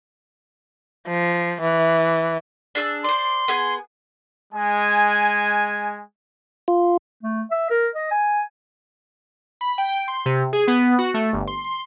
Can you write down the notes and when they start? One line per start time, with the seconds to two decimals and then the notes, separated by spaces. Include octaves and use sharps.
1.08 F3
1.61 E3
2.75 D4 G#4 E6
3.04 C5 D5 C6
3.48 B3 G#4 G#5
4.54 G#3 G#5
6.68 F4
7.23 A3
7.51 E5
7.70 A#4
7.95 D#5
8.11 G#5
9.61 B5
9.78 G5
10.08 C6
10.26 C3
10.53 G#4
10.67 B3
10.98 F#4
11.14 A3
11.33 G1
11.47 C6
11.65 C6